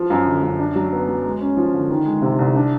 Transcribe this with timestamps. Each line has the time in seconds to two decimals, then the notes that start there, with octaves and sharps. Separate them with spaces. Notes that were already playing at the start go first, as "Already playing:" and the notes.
Already playing: F3
0.10 F#2
0.26 D3
0.43 F#2
0.59 D4
0.75 F#3
0.92 B3
1.08 F#3
1.24 G#3
1.41 C#4
1.57 F3
1.73 D3
1.90 D#3
2.06 G#3
2.22 C3
2.38 C2
2.55 D4